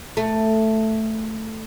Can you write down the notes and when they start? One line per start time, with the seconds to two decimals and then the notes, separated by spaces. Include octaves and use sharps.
0.17 A3